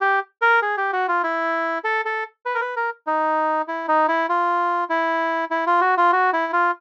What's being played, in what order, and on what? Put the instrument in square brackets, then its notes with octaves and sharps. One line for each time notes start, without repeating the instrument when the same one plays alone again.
[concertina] G4
A#4
G#4
G4
F#4
F4
E4
A4
A4
B4
A#4
B4
A#4
D#4
E4
D#4
E4
F4
E4
E4
F4
F#4
F4
F#4
E4
F4